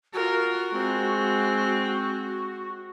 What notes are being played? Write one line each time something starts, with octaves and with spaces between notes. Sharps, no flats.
F4 F#4 A#4
G#3 C4